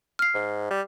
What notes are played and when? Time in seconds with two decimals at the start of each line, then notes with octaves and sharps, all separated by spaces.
0.19 F6 C7
0.34 G#2
0.71 G3